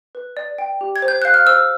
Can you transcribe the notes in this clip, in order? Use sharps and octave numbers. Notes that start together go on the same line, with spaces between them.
B4
D5
G5
G4
G#6
C5
G6
F5 F#6
F6
C5 E6